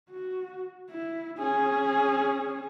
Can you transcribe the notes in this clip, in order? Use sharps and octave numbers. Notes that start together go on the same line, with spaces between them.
F#4
E4
C#4 G#4